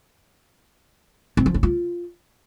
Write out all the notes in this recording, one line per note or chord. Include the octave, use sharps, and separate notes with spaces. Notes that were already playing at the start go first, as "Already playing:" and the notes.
C4
F3
C#4
F4